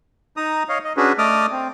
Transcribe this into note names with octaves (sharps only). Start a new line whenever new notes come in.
D#4 A#5 D#6
C#5 D#5 F5
D#5
C#4 D4 F#4 G#4 B4
A3 D5 D#5 D6 D#6 F6
C4